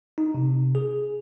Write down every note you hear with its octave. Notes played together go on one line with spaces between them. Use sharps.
D#4
C3
G#4